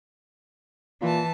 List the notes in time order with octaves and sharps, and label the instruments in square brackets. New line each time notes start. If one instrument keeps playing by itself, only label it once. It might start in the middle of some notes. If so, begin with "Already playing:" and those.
[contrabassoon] A#2 [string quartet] E3 A5